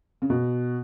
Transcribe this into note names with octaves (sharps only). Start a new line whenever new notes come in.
C#3
B2